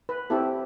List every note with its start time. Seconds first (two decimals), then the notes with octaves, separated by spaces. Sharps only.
0.09 B4
0.30 C4 E4 G4 A4